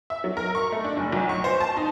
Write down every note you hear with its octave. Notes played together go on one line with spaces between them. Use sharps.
E5
F#3
A#4
C#6
A3
D4
F#1
B1
C#6
C5
A5
D#4